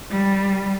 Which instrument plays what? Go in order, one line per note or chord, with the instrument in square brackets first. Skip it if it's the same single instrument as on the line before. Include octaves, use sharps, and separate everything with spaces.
[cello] G3